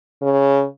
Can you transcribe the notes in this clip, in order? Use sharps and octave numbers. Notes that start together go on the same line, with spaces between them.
C#3